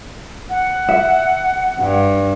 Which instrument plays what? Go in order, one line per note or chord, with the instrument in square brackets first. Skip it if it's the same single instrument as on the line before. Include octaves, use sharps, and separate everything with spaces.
[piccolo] F#5
[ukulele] E5
[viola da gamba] G2